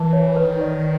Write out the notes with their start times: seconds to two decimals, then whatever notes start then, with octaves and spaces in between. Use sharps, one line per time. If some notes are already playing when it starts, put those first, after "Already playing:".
Already playing: E3 A#4 A5
0.13 C#5
0.36 D#3 B4
0.61 D5